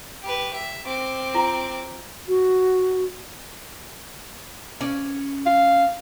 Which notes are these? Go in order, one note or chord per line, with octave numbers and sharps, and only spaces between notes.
G4 B4
E5
C4 D6
F4 A#5
F#4
C#4 D5
F5